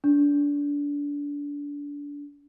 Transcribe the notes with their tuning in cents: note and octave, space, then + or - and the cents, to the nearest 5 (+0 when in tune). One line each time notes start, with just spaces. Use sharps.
D4 -25